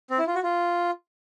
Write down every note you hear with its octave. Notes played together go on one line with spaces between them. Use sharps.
C4
E4
F4
F#4
F4